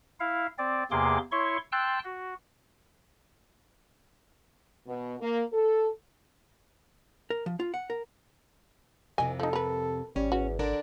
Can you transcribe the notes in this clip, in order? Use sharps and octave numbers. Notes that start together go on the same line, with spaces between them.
E4 F5
C4 D5
E2 C3 A#3 G#4 C6 D6
E4 C#5 C6 C#6
G5 A5 C6 E6 F#6
F#4
B2
A#3
A4
A#4
F3
F4
F#5
A#4
C2 F2 C3 D#5 G#5
F3 D#4 A4
A#4 B4
G#1 G3 C#4
E2 F#4
D3 D4 A#4 D5